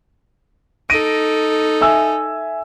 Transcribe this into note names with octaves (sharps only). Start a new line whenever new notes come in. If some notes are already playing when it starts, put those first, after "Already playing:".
D#4 A4 A#6 D7 D#7
E5 G#5 E6